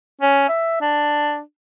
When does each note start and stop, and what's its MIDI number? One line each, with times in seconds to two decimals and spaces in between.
0.21 0.44 61
0.48 0.81 76
0.81 1.40 62